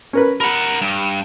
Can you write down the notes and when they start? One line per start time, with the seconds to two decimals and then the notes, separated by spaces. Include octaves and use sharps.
0.13 C#4 A#4 B4
0.40 A#4 F#5 B5
0.82 G2